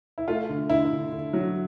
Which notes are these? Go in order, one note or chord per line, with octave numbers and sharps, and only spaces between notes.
E4
A3 F4
D3
D3 E4
D3
D3
F#3